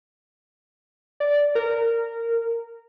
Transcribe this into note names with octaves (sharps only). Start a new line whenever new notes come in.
D5
A#4